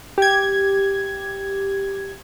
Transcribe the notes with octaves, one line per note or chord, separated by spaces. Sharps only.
G4 G#6